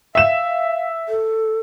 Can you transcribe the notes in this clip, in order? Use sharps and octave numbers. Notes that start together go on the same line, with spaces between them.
E5 F5 E7
A4